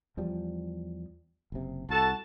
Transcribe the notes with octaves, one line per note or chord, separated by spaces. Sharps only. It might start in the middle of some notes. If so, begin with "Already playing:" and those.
E2 F3 G3
F#1 C3
C2 F#4 A4 A5